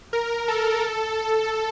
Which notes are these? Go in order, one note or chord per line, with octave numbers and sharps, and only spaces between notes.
A#4
A4
A4